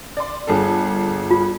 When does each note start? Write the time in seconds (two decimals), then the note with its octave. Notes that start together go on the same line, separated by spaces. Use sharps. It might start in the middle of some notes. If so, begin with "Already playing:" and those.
0.17 D5 C6
0.47 G1 G#4 A4
1.31 F4